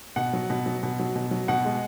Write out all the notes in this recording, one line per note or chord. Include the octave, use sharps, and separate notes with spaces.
B2 F#5
F#3
B2
F#3
B2
F#3
B2
F#3
B2 F#5
G#3